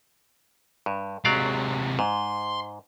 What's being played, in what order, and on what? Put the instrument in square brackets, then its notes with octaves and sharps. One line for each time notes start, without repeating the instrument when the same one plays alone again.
[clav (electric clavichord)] G2
[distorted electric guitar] C3 G#3 [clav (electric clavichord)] F#3 D5 F5
[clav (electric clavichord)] G#2 [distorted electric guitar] C6